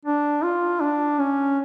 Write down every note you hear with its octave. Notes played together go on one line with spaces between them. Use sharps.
D4
F4
D4
C#4